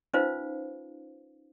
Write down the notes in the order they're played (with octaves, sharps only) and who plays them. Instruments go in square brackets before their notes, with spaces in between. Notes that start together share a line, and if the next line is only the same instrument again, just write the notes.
[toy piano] C#4 D#4 F4 B4 C5 F5